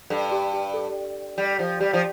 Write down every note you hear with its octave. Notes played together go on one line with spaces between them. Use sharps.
G2 A4
G4
G4
A4
G3
F3
G3 G4
F3